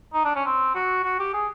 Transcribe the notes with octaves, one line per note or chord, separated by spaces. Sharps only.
D#4
D4
C#4
C4
F#4
F#4
G4
G#4